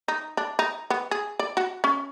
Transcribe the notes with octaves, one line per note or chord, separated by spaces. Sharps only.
D#4
D4
D#4
B3
G#4
D5
F#4
C#4